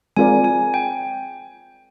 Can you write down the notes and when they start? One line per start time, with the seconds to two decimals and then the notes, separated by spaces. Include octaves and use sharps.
0.16 G#3 C4 F4 A#4 D5 G#5
0.44 G#5
0.74 G5